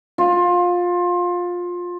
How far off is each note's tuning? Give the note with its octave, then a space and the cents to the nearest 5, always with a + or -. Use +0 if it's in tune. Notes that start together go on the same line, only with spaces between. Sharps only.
F4 +20